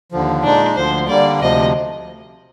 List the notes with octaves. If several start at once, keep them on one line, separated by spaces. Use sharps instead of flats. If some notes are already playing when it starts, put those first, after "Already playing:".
D#2 D3 F3
A#2 G#3 D4 D#4
D2 D3 F3 C5
D3 G3 A#3 D5
D2 C3 F3 D#5